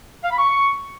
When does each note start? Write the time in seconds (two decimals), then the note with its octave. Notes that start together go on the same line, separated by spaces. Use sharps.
0.23 F5
0.31 B5
0.38 C#6